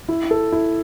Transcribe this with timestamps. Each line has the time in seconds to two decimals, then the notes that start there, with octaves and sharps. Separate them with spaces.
0.09 E4
0.31 A4
0.52 E4